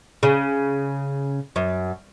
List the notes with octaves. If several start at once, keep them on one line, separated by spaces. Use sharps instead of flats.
C#3
F#2